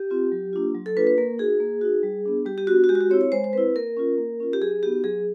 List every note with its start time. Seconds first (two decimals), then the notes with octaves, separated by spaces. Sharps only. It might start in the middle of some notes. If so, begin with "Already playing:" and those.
Already playing: G4
0.10 C4 F4
0.32 F#3
0.53 A#3 D4 F4
0.75 F#3
0.86 A4
0.96 A#3 D4 F4 B4
1.07 B4
1.18 A#3 A#4
1.38 D#4 F#4 G#4
1.60 A#3
1.81 D#4 F#4
2.03 G3
2.26 B3 D4
2.46 G3 G4
2.58 G4
2.67 B3 D4 F#4
2.84 F#4
2.89 G#3 G4
2.95 F#4
3.01 G4
3.10 C4 E4 C#5
3.21 C#5
3.32 G#3 C5
3.44 C5
3.53 C4 E4 B4
3.75 A#3 A#4
3.97 C#4 F4
4.18 A#3
4.40 C#4 F4
4.53 G4
4.61 F#3 G#4
4.83 B3 D#4 F#4 G4
5.04 F#3 G#4